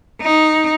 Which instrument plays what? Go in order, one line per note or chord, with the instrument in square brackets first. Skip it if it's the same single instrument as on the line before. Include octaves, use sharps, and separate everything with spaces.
[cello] D#4